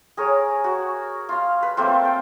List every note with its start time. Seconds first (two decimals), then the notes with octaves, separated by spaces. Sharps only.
0.17 G#4 A#4 C#5
0.64 F#4
1.29 F4 F5
1.63 B4
1.77 A3 A#3 C4 F4
2.05 G5